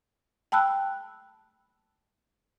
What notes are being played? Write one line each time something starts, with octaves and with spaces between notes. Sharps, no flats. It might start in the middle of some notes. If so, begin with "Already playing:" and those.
G5 A5 B5 E6 F#6